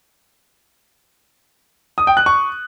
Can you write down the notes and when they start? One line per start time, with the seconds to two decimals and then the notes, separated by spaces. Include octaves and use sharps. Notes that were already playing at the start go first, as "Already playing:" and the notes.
1.98 D#6
2.07 G5
2.17 F#6
2.26 C#6